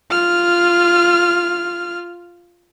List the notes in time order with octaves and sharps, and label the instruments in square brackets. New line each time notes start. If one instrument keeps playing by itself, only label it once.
[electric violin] F4 F6